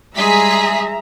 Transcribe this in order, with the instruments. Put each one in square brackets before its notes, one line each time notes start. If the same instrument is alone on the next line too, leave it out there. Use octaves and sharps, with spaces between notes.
[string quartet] G3 G#3 [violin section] G#4 B6 [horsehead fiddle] E5 A#5